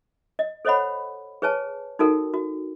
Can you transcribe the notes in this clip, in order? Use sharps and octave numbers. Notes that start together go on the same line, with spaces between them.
D#5
A4 C5 C#5 D#5 F#5 B5
G#4 B4 C#5 G#5 A5
D#4 F#4 A4 A#4 G5
F#4